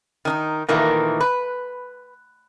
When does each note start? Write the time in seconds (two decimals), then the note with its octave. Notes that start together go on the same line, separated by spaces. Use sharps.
0.25 D#3 D4 D#4
0.68 A#2 D#3 E3 A3 A#3
1.20 B4